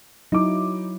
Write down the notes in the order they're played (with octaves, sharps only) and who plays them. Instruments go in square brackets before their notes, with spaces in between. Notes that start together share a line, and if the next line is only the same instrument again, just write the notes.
[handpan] F#3 E4 [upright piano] D#4 D6